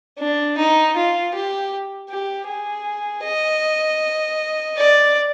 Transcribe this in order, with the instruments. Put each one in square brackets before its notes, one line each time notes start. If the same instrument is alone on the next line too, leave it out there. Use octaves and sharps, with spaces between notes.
[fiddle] D4
D#4
F4
G4
G4
G#4
D#5
D5